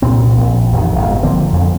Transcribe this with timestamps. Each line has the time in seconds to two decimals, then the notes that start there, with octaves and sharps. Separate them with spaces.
0.02 C2 A#2 C4
0.37 A#1
0.72 A1 F2 C3 D#3
0.95 G1 G#2 B2
1.23 D3 F3 A#3 C4
1.52 F2 D3